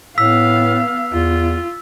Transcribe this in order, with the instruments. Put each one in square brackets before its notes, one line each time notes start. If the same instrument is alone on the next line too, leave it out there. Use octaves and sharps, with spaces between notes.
[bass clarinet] A2 [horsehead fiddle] B3 F5 [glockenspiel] E6 B6
[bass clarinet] E2 [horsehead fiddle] F4